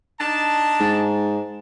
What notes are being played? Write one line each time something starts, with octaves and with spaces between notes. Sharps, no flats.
D4 D#4 A5
G#2